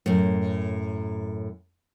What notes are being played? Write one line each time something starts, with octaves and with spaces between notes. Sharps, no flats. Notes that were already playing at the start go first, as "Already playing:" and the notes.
F#2 A2